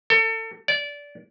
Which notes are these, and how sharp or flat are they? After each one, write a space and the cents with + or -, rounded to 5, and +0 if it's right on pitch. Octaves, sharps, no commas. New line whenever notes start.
A4 +30
D5 -20